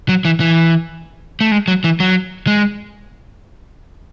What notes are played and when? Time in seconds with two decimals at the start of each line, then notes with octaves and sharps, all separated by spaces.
0.09 F#3
0.25 E3
0.40 E3
1.41 A3
1.52 G#3
1.68 F#3
1.84 E3
2.00 F#3
2.47 G#3